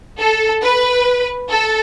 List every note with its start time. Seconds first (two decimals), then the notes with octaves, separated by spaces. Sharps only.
0.19 A4
0.63 B4
1.50 A4